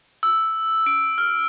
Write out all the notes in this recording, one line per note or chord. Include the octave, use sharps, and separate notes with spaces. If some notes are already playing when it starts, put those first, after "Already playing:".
E6
D7
F6